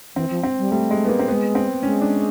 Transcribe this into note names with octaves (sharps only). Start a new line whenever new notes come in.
E3 C4
F3
C4
G3
G3 A3
G#3
B3
A#3
C4
G#3 B3
C4
G#3 C#4
D4